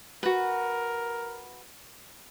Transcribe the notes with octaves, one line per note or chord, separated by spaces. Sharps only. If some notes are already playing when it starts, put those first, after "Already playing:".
F#4 A#4 B4